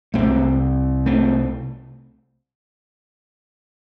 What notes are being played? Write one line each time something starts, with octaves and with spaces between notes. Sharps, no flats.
C2 C3 A3 C4
A3 C4